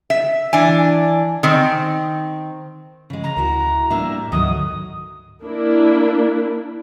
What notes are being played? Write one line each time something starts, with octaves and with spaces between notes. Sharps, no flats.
E5
E3 D4 G#5
D#3 C4
C#3 G#3
A#5
D2 E4 F#4 A#4
A2 G3 A#3 D4 E5 A#5
D2 G#2 D3 D#3 F#3 D#6
A#3 D4 E4